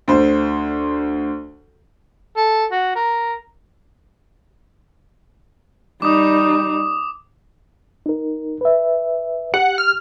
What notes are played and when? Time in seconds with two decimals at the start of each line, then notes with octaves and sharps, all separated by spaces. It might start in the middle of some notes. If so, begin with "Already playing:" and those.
0.08 D2 C5
2.37 A4
2.72 F#4
2.96 A#4
6.02 G3 D#4 D6 D#6
8.06 D#4 A#4
8.61 B4 E5
9.54 G4 F#5
9.78 F6